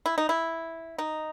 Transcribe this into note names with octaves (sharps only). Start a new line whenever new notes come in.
E4
D#4
E4
D#4